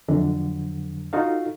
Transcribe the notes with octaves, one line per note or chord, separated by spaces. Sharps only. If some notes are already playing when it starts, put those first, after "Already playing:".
F2 D3 F#3
D#4 F4 F#4 A4 F5